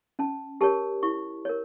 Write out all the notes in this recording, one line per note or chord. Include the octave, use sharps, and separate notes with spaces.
C#4 A5
G4 A#4 C#5 A5
E4 C#6
A#4 C#5